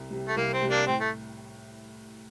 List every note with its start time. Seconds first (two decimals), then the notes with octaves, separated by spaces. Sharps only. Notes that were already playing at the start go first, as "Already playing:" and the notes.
Already playing: C2
0.10 C3 G3
0.28 A3
0.36 C2 A#3
0.53 C4
0.62 C3 G3
0.70 A#3 D4
0.86 A2 C4
1.00 A3